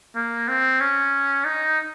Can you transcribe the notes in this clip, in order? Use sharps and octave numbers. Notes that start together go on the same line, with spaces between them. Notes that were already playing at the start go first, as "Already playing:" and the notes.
A#3
C4
C#4
D#4